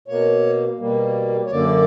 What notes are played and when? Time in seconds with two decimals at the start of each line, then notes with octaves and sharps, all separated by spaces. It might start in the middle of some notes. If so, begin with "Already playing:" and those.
0.08 B2 A#3 C#5
0.79 B2 G3 A#3
1.46 C#5
1.51 F#2 D3 A#3 D5